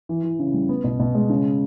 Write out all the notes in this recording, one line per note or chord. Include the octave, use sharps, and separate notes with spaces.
E3
E3
C#3
G3
B3
B2
B2
G#3
C#3